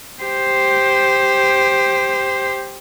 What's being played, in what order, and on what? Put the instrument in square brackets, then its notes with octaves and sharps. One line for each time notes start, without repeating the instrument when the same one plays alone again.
[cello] G4 C5